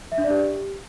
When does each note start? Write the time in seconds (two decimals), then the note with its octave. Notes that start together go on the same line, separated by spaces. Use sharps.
0.12 E5
0.18 D4
0.24 D5
0.30 G4